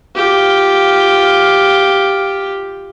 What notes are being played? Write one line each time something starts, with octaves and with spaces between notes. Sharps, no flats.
F4 G4